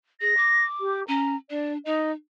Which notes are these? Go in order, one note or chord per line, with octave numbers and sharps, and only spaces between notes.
G#4 A#6
D6
G4
C#4 A#5
D4 D5
D#4 D#5